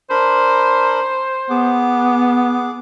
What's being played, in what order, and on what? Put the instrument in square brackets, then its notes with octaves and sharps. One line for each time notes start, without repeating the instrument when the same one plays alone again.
[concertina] D4 A#4 B5 [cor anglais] C5
[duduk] B3 [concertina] G#4 D6